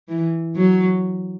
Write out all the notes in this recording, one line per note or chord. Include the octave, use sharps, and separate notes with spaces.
E3
F#3